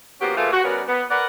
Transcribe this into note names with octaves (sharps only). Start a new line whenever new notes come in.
F3 A#3 B3 C#4 F#4 G4
A#2 A3 F4 G#4 B4 F5
F#4
G3 B3 C#4 F#4 A#4 D5
B3
A#4 B4 D5 F#5